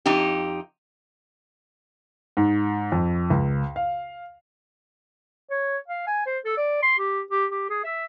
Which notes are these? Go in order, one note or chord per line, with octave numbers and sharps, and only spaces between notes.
F2 D#4 G4
G#2
F2
C#2
F5
C#5
F5
G#5
C5
A4
D5
C6
G4
G4
G4
G#4
E5